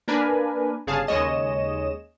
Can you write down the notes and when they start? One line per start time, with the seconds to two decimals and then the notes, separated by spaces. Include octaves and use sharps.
0.08 A#3 D4 A#4 B4 G#5
0.87 G1 C#3 G#4 F5 A5
1.07 D#2 C#3 G#3 C#5 D#5 E7